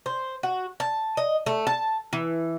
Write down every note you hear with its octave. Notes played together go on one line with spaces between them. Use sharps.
C5
F#4
A5
D#5
A3
A5
E3